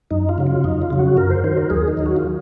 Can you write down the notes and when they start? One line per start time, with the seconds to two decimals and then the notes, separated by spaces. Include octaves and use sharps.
0.11 F#2 D#4
0.29 F4
0.38 C#3 F#3
0.47 F4
0.64 F2 D#4
0.82 F4
0.90 C#3 F#3
0.99 F#4
1.17 F#2 A#4
1.30 C5
1.44 D#3 F#3 C5
1.57 A#4
1.70 D#2 G#4
1.88 D#4
1.97 D#3 F#3
2.06 F#4
2.16 F4